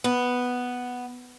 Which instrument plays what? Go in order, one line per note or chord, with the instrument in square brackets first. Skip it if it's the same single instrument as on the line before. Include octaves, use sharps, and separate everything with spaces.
[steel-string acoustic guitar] B3